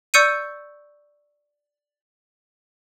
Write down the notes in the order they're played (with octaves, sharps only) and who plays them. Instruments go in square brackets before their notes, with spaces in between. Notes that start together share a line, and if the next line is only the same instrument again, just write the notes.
[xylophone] D5 C#6 E6 G6 C#7 D#7